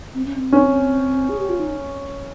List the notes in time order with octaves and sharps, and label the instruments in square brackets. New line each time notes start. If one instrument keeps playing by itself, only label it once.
[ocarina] C4
C#4
C4
[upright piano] C#4
[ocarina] G#4
G4
F4
D#4